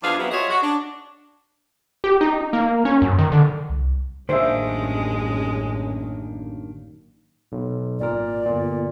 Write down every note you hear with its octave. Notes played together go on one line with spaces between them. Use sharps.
E2 F3 D4 G#4 B4 F5
E3 F#3 B3 C4 E4
F4 F#4 G#4 C#5 D#5 E5
F#4
D4
G4
D#4
A#3
C#4
F#2
D#3
D3
C2
A1 F#2 D#3 G#3 A#3 D4 C5 E5
B1
G#1 A#2 A#4 D5
G1 A#2